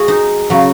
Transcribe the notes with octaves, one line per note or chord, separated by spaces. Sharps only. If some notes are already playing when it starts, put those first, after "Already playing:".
Already playing: G#3 F#4 G#4
D#4
C#3 F#3